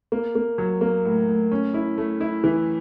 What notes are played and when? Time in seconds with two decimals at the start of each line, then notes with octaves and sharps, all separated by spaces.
0.12 A#3
0.35 A#3
0.58 F#3
0.81 A#3
1.05 A2
1.28 A2
1.52 C#4
1.74 E4
1.98 A3
2.21 E4
2.44 E3